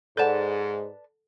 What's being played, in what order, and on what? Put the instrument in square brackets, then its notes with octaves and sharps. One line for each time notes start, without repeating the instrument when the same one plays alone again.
[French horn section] G#2 [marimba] A4 F#5 [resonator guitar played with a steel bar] B4 D5 A5